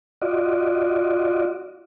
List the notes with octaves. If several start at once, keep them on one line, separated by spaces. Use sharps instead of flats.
F4 F#4 D5 D#5